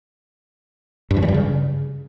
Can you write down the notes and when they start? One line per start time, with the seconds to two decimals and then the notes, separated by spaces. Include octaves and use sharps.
1.11 G2
1.17 E3
1.22 G3
1.28 G2
1.34 C#3